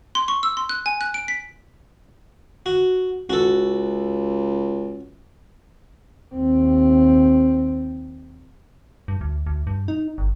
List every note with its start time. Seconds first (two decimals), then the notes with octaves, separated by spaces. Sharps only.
0.15 C6
0.28 C#6
0.43 E6
0.57 C6
0.69 F#6
0.86 G#5
1.01 F#6
1.14 D7
1.28 B6
2.66 F#4
3.30 C#2 F#4 A4
6.35 D#2 C4
9.08 G2
9.21 D2
9.47 D2
9.67 G2
9.88 D#4
10.18 G1